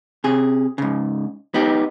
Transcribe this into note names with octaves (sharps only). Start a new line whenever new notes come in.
C3 G#4
G#2 C#3
B3 D#4 G4